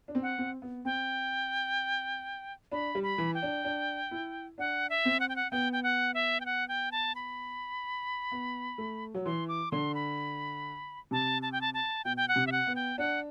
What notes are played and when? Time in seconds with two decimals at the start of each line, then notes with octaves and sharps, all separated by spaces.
0.08 D4
0.15 C4
0.22 F#5
0.38 C4
0.62 B3
0.85 C4 G5
2.72 D4 B5
2.95 G3
3.03 B5
3.18 E3
3.35 G5
3.42 D4
3.64 D4
4.11 E4
4.58 D4 F#5
4.90 E5
5.05 C4
5.20 F#5
5.29 G5
5.36 F#5
5.51 B3 G5
5.73 G5
5.83 F#5
6.14 E5
6.40 G5
6.46 F#5
6.69 G5
6.92 A5
7.15 B5
8.31 B3
8.78 A3
9.15 F#3
9.26 E3 C6
9.48 D6
9.71 D3 C6
9.95 B5
11.11 C3 A5
11.42 A5
11.52 G5
11.61 A5
11.74 A5
12.05 B2 G5
12.17 G5
12.28 F#5
12.36 C3
12.47 E5
12.52 F#5
12.67 B3
12.76 G5
12.98 D4 F#5